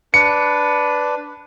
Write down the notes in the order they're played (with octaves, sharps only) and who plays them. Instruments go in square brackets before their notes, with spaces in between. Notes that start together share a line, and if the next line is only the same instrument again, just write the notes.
[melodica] D4 B4 [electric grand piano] C#7